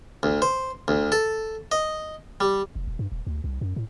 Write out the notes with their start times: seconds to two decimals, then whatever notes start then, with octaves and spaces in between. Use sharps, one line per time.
0.23 D2
0.42 C5
0.88 D2
1.12 A4
1.72 D#5
2.40 G3
2.75 F1
2.88 D#1
2.99 G2
3.12 D#1
3.27 D2
3.44 C2
3.61 F#2
3.76 A2